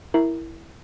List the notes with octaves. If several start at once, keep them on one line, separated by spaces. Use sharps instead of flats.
E4 A#4